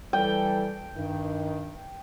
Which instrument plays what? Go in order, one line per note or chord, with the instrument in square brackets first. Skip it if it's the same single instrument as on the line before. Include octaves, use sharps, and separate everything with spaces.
[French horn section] E3 A4 [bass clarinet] G3 [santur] G5
[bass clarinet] G2 [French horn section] D#3